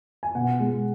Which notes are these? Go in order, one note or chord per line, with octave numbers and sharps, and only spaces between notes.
G#5
B2 F#5
G#3 B3